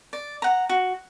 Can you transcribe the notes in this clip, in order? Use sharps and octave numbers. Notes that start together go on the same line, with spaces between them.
D5
F#5 A#5
F#4